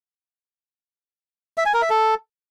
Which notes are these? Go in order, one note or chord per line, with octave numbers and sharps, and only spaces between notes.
E5
G#5
A#4
E5
A4